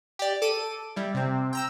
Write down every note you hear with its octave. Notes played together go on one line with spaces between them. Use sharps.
G4 D5
A4 D6 D#7
G3 E4
C3 C4
G5 A#5 E6